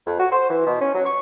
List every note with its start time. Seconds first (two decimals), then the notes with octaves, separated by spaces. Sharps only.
0.06 F2
0.19 F#4
0.32 C5
0.49 E3
0.67 B2
0.81 C#4
0.94 F#3
1.06 C#6